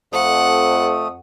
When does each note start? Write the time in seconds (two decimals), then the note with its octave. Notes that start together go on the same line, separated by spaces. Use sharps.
0.13 F2 A3 F#5 D#6